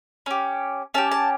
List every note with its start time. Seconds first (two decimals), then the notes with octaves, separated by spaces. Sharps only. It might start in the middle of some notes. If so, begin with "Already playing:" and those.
0.26 C#4 G4
0.94 C#4 G4 A5
1.12 A5